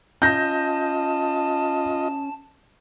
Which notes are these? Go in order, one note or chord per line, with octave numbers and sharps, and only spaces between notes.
C#4 F4 D#5 A5 G6 A#6